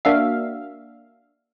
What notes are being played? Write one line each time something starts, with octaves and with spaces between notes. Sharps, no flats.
A#3 D4 F#4 E5 F5